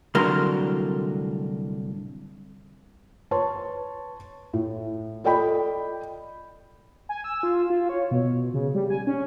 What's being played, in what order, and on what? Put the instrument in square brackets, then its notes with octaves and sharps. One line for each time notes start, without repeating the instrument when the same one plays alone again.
[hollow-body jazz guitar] C2 A2 D3 F#3 A#4 C6
[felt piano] B4 C#5 A5 C6
A2
F4 A4 D5 D#5 G5 B5
[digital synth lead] G#5
E6
F4
F4
C#5
B2
C#3
G3
G#5
C#4